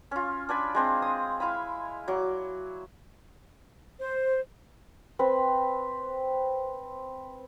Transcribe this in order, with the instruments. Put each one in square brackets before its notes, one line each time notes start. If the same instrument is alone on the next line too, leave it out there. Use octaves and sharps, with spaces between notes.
[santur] C#4 F4
D4 D5 G#5 B5
G#3 C4 D4
D#6
E4 F5 G#5 B5
F#3 D5 D6
[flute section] C5
[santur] C4 B4